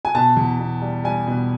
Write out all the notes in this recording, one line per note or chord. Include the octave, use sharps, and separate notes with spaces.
G#5
B2 A5
E2
B2
G3
G3 G#5
B2